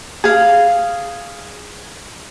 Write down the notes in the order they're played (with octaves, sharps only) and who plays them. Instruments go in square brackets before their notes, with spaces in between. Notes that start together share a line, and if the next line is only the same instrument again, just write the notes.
[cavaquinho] G#4 F5